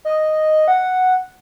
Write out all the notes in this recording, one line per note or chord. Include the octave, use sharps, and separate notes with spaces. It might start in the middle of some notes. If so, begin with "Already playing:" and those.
D#5
F#5